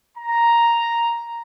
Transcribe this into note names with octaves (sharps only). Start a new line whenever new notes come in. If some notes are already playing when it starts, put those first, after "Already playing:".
A#5